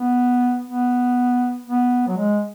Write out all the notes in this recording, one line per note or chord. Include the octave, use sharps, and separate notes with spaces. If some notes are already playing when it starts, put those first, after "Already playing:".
Already playing: B3
B3
B3
F#3
G#3